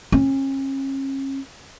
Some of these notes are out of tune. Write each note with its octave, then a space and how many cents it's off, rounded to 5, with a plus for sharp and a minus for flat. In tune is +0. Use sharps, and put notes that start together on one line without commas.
C#4 -35